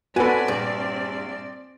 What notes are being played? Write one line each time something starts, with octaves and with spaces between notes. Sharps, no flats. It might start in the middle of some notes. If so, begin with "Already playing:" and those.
B3 C4 F#4 A4 B4 D5 G#5
A#1 G2